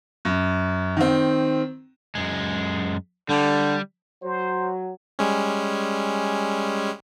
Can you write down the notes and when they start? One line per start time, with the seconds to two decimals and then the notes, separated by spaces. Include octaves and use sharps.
0.25 F#2
0.97 D#3 C4
2.15 F#2 G#3
3.29 D3 G3
4.23 F#3 C5
5.19 G3 G#3 C#4